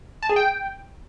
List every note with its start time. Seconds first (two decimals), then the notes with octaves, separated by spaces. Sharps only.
0.23 A5
0.29 G#4
0.36 G5